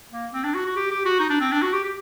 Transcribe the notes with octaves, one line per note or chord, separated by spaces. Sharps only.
A#3
C4
D4
F#4
F#4
G4
G4
F#4
D#4
D4
C4
D4
F#4
G4
G4